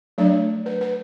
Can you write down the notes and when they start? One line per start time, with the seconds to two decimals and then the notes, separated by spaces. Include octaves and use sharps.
0.18 F#3 A3 D4 D5
0.66 B4
0.81 B4